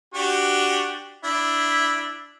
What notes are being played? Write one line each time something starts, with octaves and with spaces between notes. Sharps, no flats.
D4 F#4 G4
D4 E4